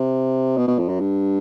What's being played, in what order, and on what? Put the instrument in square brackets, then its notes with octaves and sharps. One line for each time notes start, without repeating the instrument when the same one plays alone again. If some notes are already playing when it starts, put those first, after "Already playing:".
Already playing: [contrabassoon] C3
B2
B2
F2
F#2
G2